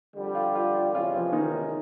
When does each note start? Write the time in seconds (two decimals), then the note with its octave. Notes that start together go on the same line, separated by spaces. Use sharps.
0.15 F2 D3 G3
0.35 F4
0.55 F4
0.75 F4
0.93 E2 C3 E3 G#3 C#4 F4
1.15 F3 F4
1.32 D#3 D#4